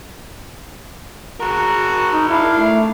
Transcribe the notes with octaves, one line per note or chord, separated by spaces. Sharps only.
F#4 G#4 A#4
D#4
D4 E4 F5
A3